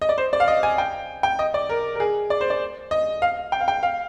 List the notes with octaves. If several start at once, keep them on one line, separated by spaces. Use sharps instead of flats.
D#5
D5
C5
D5
F5
D#5
G#5
G5
G5
D#5
D5
A#4
A#4
G#4
D5
C5
D5
D#5
F5
G5
F5
G5
F5